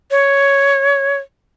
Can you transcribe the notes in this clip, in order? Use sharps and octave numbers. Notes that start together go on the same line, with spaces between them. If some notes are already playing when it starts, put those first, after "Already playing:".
C#5